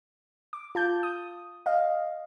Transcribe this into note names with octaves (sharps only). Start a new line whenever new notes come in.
D6
F4 A5 G6
D#6
D#5 F5